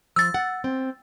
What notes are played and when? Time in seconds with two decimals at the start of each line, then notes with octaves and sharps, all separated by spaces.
0.16 F3 E6 A6
0.34 F#5
0.64 C4